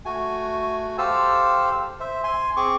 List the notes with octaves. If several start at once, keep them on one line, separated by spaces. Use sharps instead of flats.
A3 F#4 G#5
G4 A4 C5 F5 A5 E6
C5 E5
G#5 C6
C4 G#4 C#6 D6